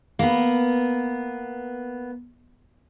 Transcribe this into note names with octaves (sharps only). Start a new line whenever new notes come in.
A#3 B3